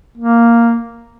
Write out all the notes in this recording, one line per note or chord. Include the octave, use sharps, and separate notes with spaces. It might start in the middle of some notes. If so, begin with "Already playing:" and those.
A#3